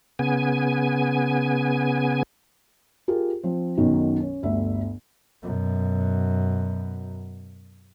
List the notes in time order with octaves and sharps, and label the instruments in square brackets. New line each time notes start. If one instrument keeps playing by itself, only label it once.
[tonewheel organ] C#3 B3 G#5
[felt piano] F4 G4 G#4 A#4
F3 C4
B1 F#2 B2 D#3 F#3
C#4
G1 D2 E5
[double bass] F#2 B2